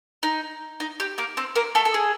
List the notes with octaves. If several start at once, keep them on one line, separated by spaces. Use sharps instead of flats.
D#4
D#4
G4
A#3 A#4
C4 C5
A#3 A#4
A3 A4
A4
G#4